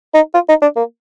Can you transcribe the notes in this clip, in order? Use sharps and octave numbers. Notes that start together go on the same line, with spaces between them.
D#4
F4
D#4
D4
A#3